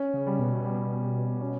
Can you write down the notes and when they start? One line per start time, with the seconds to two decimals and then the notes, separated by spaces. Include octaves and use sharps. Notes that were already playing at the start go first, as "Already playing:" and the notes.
Already playing: C#4
0.14 C#3
0.26 G3
0.39 B2
0.65 G3
1.03 G4
1.41 C#4